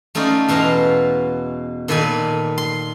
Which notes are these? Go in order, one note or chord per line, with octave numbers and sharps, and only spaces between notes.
A3 C#4 D#4 F4 D5
E2 B2 E4 F4 F5 A#5
A#2 D#3 A4 B4 D5 G#5
C6